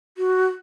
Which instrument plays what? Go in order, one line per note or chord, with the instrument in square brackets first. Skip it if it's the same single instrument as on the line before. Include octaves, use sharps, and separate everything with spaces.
[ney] F#4